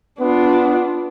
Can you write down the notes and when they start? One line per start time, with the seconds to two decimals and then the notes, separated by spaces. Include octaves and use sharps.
0.20 B3 D4 F4